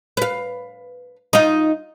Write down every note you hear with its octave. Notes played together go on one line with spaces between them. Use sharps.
B4 F5
D#4 F4